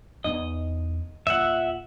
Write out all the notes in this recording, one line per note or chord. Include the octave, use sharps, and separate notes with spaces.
E2 D#4 D#5
D#1 F4 E5 F#5